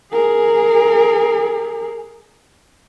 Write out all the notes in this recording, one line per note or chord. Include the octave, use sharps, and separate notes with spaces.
G#4 A#4